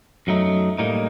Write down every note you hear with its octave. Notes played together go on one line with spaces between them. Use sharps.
F#2 F#3 A3 D#4
A2 G3 A#3 D#4